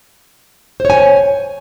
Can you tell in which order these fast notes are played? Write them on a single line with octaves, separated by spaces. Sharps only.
C5 C#5 G#5